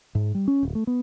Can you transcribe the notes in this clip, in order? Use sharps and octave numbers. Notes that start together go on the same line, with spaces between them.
G#2
G3
C#4
D1
A3
B3